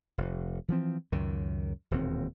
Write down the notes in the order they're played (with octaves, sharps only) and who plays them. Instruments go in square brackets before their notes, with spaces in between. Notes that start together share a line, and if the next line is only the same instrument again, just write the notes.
[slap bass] F1
E3 F3 C4
C#2 F#2 D#3
E1 D#2 A#2 C4